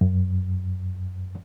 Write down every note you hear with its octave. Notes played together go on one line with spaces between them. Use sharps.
F#2